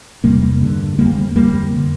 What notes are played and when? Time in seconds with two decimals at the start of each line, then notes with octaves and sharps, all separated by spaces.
0.24 E2 C3 G3 A#3
0.61 G2 D3
0.98 F2 D3 G3 A#3
1.36 F2 D3 G3 A#3
1.76 D3